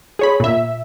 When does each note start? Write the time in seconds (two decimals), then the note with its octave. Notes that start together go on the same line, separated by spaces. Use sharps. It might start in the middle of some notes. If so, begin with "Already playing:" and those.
0.19 G#4 C#5 B5
0.40 A#2 E5